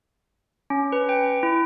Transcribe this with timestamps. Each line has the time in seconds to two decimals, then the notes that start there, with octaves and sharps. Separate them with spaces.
0.70 C#4
0.92 B4
1.09 G5
1.43 E4